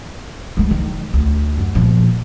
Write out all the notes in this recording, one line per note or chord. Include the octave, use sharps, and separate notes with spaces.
E3 G#3
D#3
D2
F#2
A#2 F3